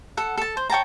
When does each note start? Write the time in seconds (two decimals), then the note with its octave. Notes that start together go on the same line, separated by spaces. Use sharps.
0.17 A4 F#5
0.37 A4 A5
0.57 C5
0.70 C#5 G5 A5 A#5